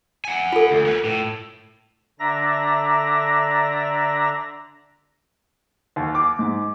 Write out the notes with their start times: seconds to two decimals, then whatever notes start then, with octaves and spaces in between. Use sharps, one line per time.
0.25 F#5 G#5
0.52 F4 A4
0.71 D2
0.86 A#4 B4
1.05 A2
2.20 D3 D4 D5 E5 A#5 A#6
5.96 D#2
6.15 D6
6.39 G#2